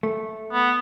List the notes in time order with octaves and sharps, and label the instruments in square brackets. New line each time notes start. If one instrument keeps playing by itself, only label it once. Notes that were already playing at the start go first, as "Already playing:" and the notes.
[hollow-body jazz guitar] A3
[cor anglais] B3